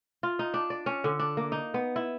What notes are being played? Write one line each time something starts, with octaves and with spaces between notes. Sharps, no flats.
F4
D#4
D4
D5
C#4
D3
D4
A#3
D#4
B3
E4